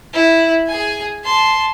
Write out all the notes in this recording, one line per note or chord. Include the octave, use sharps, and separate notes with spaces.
E4
G#4 G#5
A5 C6